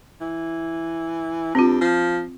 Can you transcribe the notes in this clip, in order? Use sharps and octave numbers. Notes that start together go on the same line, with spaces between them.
E3
G2 C4 F4
F3